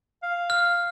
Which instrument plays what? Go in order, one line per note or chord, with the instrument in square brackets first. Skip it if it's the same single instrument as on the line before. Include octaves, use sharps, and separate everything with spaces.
[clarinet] F5
[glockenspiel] F6